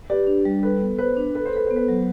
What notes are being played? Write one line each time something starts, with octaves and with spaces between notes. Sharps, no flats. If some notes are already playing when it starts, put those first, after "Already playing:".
G4 B4 D5
D4
G3
A4 B4
B3
B4 C5
D4
A4 B4
C5
A4 B4
B3 C5
B4
F#3